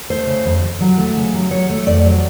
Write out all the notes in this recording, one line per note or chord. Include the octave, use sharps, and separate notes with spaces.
A3 C5
C#3
F2
F2
F#3
A3
C#3
F#3
F#3 C#5
A3
F2 D5
F#3